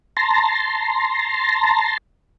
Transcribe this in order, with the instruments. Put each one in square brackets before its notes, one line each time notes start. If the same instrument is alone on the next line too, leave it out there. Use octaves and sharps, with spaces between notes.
[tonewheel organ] A5 A#5 C6